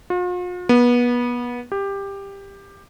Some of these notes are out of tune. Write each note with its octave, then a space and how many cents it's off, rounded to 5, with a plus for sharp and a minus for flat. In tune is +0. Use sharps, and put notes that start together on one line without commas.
F4 +45
B3 -25
G4 +15